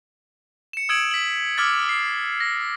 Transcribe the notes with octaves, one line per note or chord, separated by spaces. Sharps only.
C#7 E7
D#6 E6 G#6 D7 E7 F#7
B6 F#7
D6 E6 F6 G#6 A6
C7
A#6